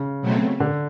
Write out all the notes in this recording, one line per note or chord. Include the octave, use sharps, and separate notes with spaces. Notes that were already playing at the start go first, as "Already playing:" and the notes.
Already playing: C#3
B2 F#3 A3 C4
D3